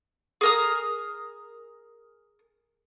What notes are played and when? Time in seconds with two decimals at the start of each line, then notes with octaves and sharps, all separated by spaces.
0.41 G#4 A#4 D#6